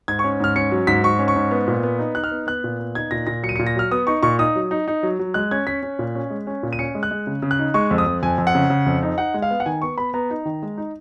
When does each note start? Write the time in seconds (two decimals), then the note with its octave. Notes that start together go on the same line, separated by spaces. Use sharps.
0.08 G#2 G#6
0.19 C#6
0.24 C#4
0.40 G#2 F6
0.56 C#4 C#7
0.72 F#3
0.87 G#2 B6
1.04 G#2 C#6
1.19 C#4
1.28 C#6
1.36 G#2
1.51 B3
1.68 A#2
1.83 B3
1.99 D#4
2.15 D#4 F#6
2.24 F6
2.31 B3
2.47 B3 F#6
2.64 A#2
2.79 B3
2.95 D#4 G#6
3.11 A#2 A#6
3.27 A#2 A#6
3.43 F#3 C#7
3.49 D#7
3.56 C#7
3.59 A#2
3.67 A#6
3.75 F#3 F6
3.91 B3 D#6
4.07 D#4 C#6
4.23 A#2 C#6
4.39 D#4 D#6
4.56 F#3
4.71 D#4
4.88 D#4
5.03 F#3
5.19 F#3
5.34 G#3 F#6
5.51 C#4 G#6
5.67 C#4 B6
5.83 C#4
5.99 A#2
6.15 C#4
6.30 G#3
6.47 C#4
6.63 A#2
6.73 D#7
6.79 C#4 C#7
6.95 G#3
7.03 F#6
7.11 G#3
7.27 C#3
7.42 C#3
7.51 F#6
7.59 D#4
7.74 G#3 C#6
7.91 F2
7.98 D#6
8.06 F2
8.23 F2 G#5
8.38 F2
8.47 F#5
8.55 C#3
8.70 C#3
8.86 F2
9.03 D#4
9.18 D#4 F#5
9.34 G#3
9.42 F5
9.50 B3
9.60 F#5
9.66 D#3 G#5
9.82 B3 C#6
9.98 B3 B5
10.14 B3 A#5
10.30 D#4
10.45 D#3
10.63 G#3
10.77 D#4